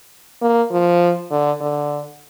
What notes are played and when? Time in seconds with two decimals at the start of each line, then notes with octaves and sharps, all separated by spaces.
0.42 A#3
0.72 F3
1.31 D3
1.60 D3